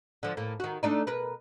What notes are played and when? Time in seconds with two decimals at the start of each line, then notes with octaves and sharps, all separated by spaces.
0.23 D3 F3
0.37 A2 A#3
0.60 D#3 F#4
0.83 A3 D4 D#4
1.07 B2 A#4 B4